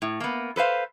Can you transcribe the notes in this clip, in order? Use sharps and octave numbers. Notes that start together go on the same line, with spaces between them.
A2
A#3 B3
A4 B4 C5 F5